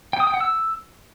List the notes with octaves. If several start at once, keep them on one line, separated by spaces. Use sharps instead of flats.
G5
D#6
G5
F#5
E6